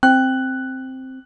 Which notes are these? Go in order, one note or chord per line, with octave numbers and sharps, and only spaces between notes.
C4 G5 F#6